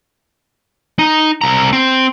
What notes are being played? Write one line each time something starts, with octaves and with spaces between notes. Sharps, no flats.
D#4
C2 A#5
C4